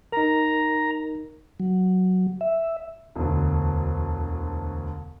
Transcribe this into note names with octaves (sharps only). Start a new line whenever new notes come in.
D#4 A#4 A#5
F#3
E5
E1 D2